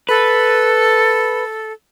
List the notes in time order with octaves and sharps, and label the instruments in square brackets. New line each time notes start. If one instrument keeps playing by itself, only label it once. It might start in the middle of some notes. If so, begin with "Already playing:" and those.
[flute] A4 [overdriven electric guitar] B4